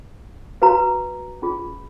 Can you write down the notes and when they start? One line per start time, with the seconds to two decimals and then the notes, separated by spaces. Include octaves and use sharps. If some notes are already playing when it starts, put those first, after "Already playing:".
0.62 F#4 B4 F5 A#5
1.42 C#4 F4 G#4